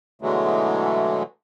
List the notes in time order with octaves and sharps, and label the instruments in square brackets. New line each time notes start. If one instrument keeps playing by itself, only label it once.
[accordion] B2 D3 E3 F#3 G#3 A3